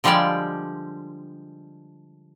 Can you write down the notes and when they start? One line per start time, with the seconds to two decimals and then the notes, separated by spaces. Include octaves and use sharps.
0.04 D3 F3 G3 G#3 G4 D5